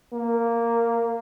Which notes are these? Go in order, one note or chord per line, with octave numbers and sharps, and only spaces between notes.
A#3